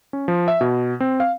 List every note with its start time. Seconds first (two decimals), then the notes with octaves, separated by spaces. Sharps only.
0.13 C#4
0.28 F3
0.48 E5
0.61 B2
1.00 C4
1.20 F5